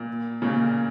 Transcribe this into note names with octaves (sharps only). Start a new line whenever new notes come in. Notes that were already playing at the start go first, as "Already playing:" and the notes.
Already playing: A#2
A#2 C#3